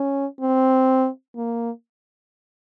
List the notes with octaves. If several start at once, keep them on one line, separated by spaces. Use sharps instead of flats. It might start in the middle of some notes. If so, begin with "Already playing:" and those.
Already playing: C#4
C4
A#3